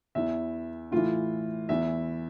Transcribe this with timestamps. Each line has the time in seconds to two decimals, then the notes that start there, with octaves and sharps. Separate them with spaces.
0.15 E2 E3 E5
0.92 A2 E3 F4
1.69 E2 E3 E5